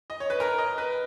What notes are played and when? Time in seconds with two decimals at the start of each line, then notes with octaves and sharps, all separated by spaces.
0.10 D#5
0.20 C#5
0.30 B4
0.40 A#4
0.58 D#5
0.78 B4